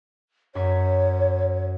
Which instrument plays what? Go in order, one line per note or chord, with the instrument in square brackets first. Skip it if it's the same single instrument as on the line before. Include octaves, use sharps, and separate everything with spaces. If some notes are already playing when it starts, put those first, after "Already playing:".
[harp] F#2 C#6 B6 [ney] C#5